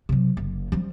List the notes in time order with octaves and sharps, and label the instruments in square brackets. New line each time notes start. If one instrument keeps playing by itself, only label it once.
[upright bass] C3 F#3
F#1
F3 G3